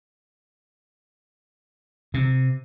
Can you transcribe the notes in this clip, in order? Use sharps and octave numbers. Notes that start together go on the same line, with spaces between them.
C3